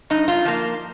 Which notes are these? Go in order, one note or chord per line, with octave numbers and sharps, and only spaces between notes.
G2 D#4
F4
F3 A#3